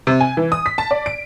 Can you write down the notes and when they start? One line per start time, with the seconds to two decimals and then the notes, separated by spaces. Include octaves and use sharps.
0.07 C3
0.20 G#5
0.37 E3
0.52 D#6
0.66 B6
0.78 A5
0.91 D5
1.06 D7